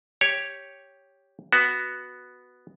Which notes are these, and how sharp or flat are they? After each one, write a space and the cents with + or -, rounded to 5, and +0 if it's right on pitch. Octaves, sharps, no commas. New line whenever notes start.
G4 +0 C#5 +0
B3 +0 F#4 +0